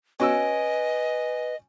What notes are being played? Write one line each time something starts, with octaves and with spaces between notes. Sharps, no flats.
C#4 F#4 B4 D#5 G#5 E6 D7